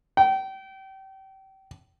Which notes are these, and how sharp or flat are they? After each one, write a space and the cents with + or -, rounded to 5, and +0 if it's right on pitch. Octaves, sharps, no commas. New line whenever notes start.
G5 -30